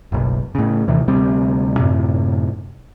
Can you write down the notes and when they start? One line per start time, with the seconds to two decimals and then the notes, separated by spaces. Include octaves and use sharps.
0.12 F#1 B1
0.55 A2 C#3
0.88 D#2 C3 D#3 E3
1.08 D2 C3 G3 C4
1.77 F#2 A2 C3